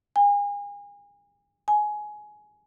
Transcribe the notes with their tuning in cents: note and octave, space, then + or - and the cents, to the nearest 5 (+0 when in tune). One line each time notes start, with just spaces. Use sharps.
G#5 -35
G#5 +15